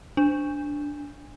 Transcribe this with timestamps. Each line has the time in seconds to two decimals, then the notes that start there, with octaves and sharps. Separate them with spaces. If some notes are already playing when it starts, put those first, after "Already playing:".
0.17 D4